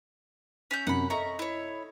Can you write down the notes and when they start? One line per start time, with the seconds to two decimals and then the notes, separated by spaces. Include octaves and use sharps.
0.71 C#4 E5 G6
0.87 F#2 C3 F#5 B5
1.10 C#4 A4 D#5 E5 A#5 C#6
1.39 E4 C#5